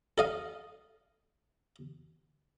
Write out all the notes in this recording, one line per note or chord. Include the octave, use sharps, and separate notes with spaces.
A4 D#5 F5